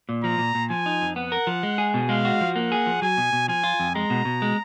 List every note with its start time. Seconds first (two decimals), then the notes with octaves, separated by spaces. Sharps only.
0.09 A#2
0.23 F3 A#5
0.39 A#2
0.55 A#2
0.70 F3 G#5
0.86 D#4
1.02 F2
1.16 B3 F#5
1.32 A#4
1.47 F3
1.63 G#3
1.78 G#4
1.94 B2
2.09 G#3 F5
2.25 F#4
2.41 F3
2.56 A#3 F#5
2.72 G#4
2.87 F3
3.02 F#3 G#5
3.17 B2
3.33 B2
3.48 F3 G#5
3.64 F4
3.80 F2
3.95 G#3 A#5
4.10 B2
4.25 B2
4.42 G#3